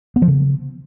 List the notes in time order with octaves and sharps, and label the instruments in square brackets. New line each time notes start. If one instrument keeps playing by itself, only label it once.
[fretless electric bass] B3
F3
C#3